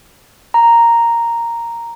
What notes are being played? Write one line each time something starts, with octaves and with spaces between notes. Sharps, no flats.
A#5